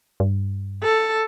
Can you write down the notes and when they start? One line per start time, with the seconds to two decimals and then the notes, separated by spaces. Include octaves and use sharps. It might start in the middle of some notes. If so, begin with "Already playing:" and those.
0.20 G2
0.83 A4